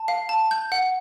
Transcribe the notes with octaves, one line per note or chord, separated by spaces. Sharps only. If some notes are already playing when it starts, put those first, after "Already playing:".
Already playing: A5
F5
A5
G6
F#5